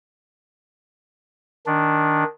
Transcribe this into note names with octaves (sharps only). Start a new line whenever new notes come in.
D#3 D4